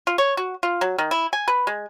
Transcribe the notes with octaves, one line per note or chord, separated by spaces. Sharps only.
F4
C#5
F#4
F4
F#3
D#3
E4
G#5
B4
G#3